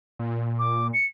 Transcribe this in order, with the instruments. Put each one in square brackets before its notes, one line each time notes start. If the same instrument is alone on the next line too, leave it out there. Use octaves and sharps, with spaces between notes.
[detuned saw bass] A#2
[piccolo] D6
C#7